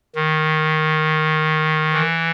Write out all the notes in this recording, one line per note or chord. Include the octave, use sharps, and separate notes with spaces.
D#3
E3